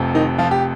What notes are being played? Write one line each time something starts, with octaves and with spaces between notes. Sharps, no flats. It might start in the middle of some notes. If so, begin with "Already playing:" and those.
Already playing: F1 F2 C3
D#3 D#4
F3 F4
G4